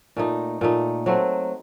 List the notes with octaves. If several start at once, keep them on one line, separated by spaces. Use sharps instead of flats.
A#2 A3 D#4
A#2 A3 D#4
F#3 A3 C4